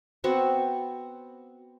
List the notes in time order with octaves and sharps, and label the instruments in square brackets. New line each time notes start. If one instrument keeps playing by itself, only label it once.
[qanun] B3 C4 F#4 C#6